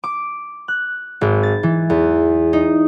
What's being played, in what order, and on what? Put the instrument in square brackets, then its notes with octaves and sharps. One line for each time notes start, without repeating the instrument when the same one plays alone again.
[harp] D6
F#6
G#1
A6
E3
E2
D#4